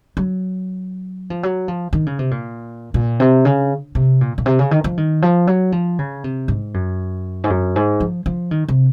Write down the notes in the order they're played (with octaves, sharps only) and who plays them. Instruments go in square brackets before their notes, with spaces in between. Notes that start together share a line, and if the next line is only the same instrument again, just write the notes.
[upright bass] F#3
F3
F#3
F3
D#3
C#3
C3
A#2
A#2
C3
C#3
C3
A#2
A#2
C3
C#3
D#3
F3
D#3
F3
F#3
F3
C#3
C3
G#2
F#2
G#2
F#2
G#2
F3
F3
D#3
C3